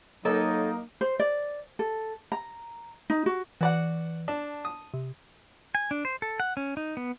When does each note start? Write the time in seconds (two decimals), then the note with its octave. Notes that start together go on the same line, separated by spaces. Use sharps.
0.25 F#3 A#3 D#4 A4 C#5 D#5
1.01 C5
1.20 D5
1.79 A4
2.32 A#5
3.10 D#4
3.26 F#4
3.61 E3 F#4 D5 F#5
4.28 D4 A5
4.65 D#6
4.94 C3
5.75 G#5
5.91 D4
6.05 C5
6.22 A4
6.40 F#5
6.57 C#4
6.77 D#4
6.97 B3